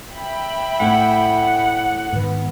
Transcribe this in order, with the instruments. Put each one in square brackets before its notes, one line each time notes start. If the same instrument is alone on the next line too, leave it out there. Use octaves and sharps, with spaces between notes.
[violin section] E5 G5 B5
[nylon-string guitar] A2 E4 [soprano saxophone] F#5
[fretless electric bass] G#2 D#3 [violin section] B3